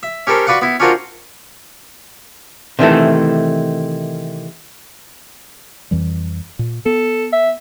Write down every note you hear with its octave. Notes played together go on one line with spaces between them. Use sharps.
E5
C#4 G4 A4 A#4 C5
F#4 B4 D5 F5 F#5
B3 E4
C#4 D4 F4 F#4 A#4 C5
C3 D#3 E3 A3
F2 E3 G3
A#2
B3 A4
E5